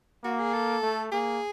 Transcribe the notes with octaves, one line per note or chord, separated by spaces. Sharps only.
A#3 F#4
G#4
A4
A3
A#3 G#4